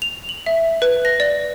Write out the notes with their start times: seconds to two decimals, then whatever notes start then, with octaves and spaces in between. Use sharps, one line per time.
0.02 F7
0.29 F#7
0.46 E5
0.82 B4
1.05 A#6
1.20 D5